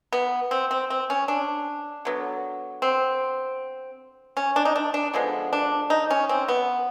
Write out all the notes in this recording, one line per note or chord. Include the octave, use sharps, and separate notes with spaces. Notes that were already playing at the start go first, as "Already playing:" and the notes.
B3
C4
C4
C4
C#4
D4
D3 F#3 B3
C4
C#4
D4
D#4
D4
D4
D3 F3 G#3 B3
D4
D#4
C#4
C4
B3